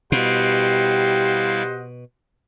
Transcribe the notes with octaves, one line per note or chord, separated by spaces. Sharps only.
B2 G3 E4 G4 C5 D#5 F5 F#5